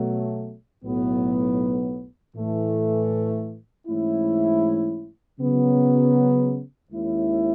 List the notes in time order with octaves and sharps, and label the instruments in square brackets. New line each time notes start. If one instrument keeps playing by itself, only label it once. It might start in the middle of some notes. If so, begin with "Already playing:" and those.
Already playing: [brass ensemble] B2 F#3 A3
B1 A2 F#3 B3
A2 E3 A3
G#2 E3 A3 C#4 E4
C#3 F#3 B3
D#2 D#3 G#3 C#4 E4